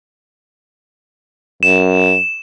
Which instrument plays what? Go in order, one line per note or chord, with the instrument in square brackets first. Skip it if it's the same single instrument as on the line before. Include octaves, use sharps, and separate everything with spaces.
[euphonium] F#2 [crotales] E7